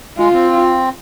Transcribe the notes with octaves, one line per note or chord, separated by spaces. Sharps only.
G#3 F4
C4